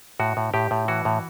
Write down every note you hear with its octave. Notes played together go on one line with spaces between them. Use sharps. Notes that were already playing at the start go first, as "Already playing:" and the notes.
A2 F#4
A2
A2 G4
A2
E3 F#4
A2